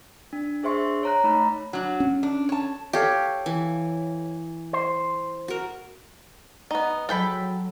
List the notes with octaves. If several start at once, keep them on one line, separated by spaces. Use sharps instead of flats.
D4
D4 G#4 C5 E5 C6 C#6
C#5 A#5 F#6
A3 D#4 A#5 B5
F#3 D4
C#4
D4
C#5 A5
G4 A4 C#5 F5
E3
C5
F#4 A#4
B3 D#4
F#3 G#3 A4 G5 B5